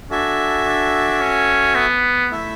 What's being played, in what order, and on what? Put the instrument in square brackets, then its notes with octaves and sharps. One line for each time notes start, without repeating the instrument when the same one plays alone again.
[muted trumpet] D4 [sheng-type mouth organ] F#4 A4 E5 G#5
[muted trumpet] D4
C#4
B3
[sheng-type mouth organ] A3 E4 A4 E5